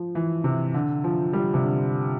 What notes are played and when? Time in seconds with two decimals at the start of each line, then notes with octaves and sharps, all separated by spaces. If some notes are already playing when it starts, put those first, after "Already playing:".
Already playing: F3
0.15 E3
0.44 C3
0.74 D3
1.04 F3
1.33 G3
1.54 C3
1.63 D3